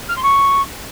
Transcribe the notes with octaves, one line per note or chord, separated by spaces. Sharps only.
F6
C6
C#6